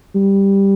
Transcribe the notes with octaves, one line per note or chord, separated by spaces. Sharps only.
G3